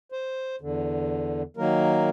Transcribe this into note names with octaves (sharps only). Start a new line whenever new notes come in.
C5
E2 D3
D#3 F#3 A#3 A#4